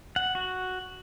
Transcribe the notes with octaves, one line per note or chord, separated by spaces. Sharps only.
F#5
F#4